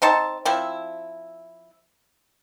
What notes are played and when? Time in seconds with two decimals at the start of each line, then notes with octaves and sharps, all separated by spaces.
0.02 C4 D#4 C5 A5
0.45 F3 C4 E4